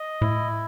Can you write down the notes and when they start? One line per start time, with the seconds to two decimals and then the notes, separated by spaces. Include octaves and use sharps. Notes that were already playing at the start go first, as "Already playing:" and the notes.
Already playing: D#5
0.22 A2 E4